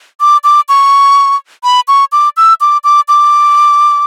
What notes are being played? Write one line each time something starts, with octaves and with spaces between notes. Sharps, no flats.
D6
D6
C#6
B5
C#6
D6
E6
D6
D6
D6